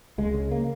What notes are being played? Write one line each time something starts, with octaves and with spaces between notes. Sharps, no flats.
C#2 G#3
C#3
A#3